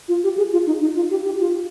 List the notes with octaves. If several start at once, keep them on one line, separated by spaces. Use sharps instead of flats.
F4
G4
G#4
F4
D#4
D#4
F4
G4
G4
F4